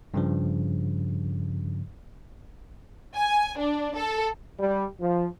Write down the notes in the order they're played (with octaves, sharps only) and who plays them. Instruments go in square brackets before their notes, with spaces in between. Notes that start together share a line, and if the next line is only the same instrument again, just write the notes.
[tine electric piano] G2 C#3 F3
[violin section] G#5
D4
A4
[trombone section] G3
F3